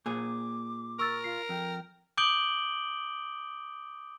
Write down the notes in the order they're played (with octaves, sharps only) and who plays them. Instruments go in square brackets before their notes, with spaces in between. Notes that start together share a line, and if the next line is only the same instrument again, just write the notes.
[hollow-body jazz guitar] A#2 G#4 [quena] D6
[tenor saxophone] A#4 [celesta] C#6 E6 A6
[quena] F4 [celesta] C7
[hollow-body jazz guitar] F2 [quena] G5
[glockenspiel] D6 D#6 G6 D7 F#7 G7